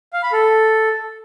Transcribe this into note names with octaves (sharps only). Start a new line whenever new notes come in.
F5
B5
A4